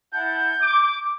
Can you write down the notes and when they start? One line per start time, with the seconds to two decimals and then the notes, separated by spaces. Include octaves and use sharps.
0.13 E4 F#5 A5 G6
0.61 D6